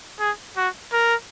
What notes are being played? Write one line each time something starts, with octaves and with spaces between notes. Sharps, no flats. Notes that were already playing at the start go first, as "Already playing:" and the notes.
G#4
F#4
A#4